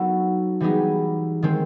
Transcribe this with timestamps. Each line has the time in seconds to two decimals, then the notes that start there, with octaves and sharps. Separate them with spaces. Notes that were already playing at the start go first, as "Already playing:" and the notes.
Already playing: F#3 B3 D#4 F#4 A4
0.60 E3 G3 B3 D#4 G#4
1.42 D#3 G#3 C4